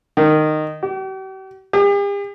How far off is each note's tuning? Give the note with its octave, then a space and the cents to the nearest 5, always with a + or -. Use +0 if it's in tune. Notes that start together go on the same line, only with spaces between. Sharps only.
D#3 -15
G4 -45
G4 +45